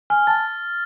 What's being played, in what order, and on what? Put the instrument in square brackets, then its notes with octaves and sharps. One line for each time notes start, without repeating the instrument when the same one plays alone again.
[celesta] G#5 [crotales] F6
[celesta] A5 [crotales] A6